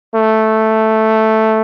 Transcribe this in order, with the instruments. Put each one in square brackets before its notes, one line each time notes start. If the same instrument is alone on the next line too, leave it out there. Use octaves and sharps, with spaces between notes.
[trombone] A3